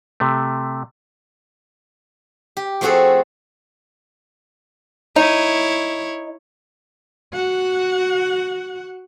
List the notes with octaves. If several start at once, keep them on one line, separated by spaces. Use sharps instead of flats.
C3 A3
G4
F3 A3 C4 F#4 G#4 A4
D#4 E4 C#5
F#4 F#5